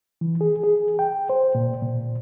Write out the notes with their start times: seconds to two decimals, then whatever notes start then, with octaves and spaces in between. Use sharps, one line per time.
0.21 E3
0.41 G#4
0.63 G#4
0.99 G5
1.30 C5
1.55 A#2
1.82 A#2